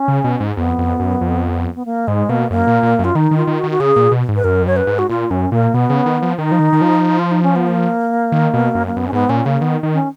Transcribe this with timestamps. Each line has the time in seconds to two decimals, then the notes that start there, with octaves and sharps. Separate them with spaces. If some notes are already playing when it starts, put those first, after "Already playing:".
Already playing: C#4
0.08 C#3
0.24 B2
0.40 G#2
0.57 F2 B3
0.78 F2
1.00 F#2
1.21 F2
1.75 B3
1.85 A#3
2.07 G#2 G#3
2.29 B2 A#3
2.50 F#2 A#3
2.67 A#2
2.83 A#2
2.99 F#2
3.04 F4
3.15 D#3 D#4
3.31 D#3
3.37 F4
3.47 D#3
3.59 F#4
3.63 D#3
3.71 F#4
3.80 C#3 G#4
3.96 A#2
4.12 B2
4.29 G#2
4.36 B4
4.44 F#2 A#4
4.62 F2
4.66 F#2 C#5
4.77 B4
4.87 G#2
4.99 F#4
5.09 A#2 F4
5.30 F#2 C#4
5.52 A#2 A#3
5.74 B2 B3
5.90 C#3
6.06 D#3
6.22 F3
6.38 D#3 D#4
6.52 F3
6.59 D#3
6.73 D#3
6.81 F3
7.19 F4
7.31 D#4
7.43 C#4
7.56 B3
7.67 A#3
8.32 D#3
8.54 B2
8.75 F#2
8.87 A#3
8.97 F#2 B3
9.08 C#4
9.13 G#2 B3
9.29 A#2 C#4
9.45 C#3 A#3
9.61 D#3 B3
9.83 D#3
9.94 C#4